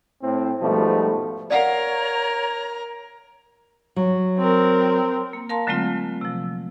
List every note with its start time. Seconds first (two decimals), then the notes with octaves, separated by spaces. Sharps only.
0.22 A2 C4
0.61 G#2 B2 F3 G3 A3
1.50 A#4 C#5 D5 F5 F#5 A#5
3.96 F#3
4.38 C4 A#4
5.33 A#3
5.49 A#4 F5 A5 A#5 C6
5.67 D3 F#3 G#3 A3 C4 F4
6.21 C3 F3